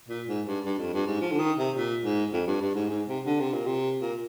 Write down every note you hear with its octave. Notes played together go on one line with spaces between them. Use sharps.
A#2
G#2
G2
G2
F2
G2
G#2
F3
D3
D#3
C3
A#2
G#2
F2
G2
G2
G#2
G#2
C3
D3
C3
A#2
C3
A#2